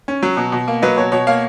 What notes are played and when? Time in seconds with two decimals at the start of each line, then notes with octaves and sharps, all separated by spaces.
0.08 C#4
0.23 F#3
0.37 B2
0.52 B2
0.68 A#3
0.82 F#3 B4 D#5
0.97 B2 C#5
1.12 B2 C#5
1.27 A#3 C#5 F5